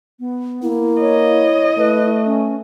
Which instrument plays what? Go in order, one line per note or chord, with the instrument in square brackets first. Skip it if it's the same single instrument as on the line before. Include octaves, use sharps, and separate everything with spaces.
[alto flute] B3
[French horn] A#3 [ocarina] E4
[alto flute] C#5 [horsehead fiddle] D#5
[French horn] A3 [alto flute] B4
[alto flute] C#4